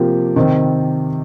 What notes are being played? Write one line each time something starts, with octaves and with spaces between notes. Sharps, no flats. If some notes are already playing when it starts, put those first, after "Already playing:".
Already playing: C3 F3 A#3 G4
C3 D#3 C4